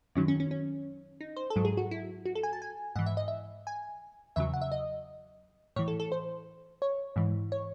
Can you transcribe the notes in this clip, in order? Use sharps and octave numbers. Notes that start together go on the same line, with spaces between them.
F#2 D#3 F#3 C#4
C#4
C#4
C#4
D#4
C5
A4
G#2 F#3
G#4
F#4
E4
F#4
A4
G#5
A5
G#5
G#2 E3 F#5
E5
D#5
E5
G#5
E2 C#3 F#3 E5
F#5
E5
D#5
A2 E3 C#5
A4
A4
C5
C#5
G#2 E3
C#5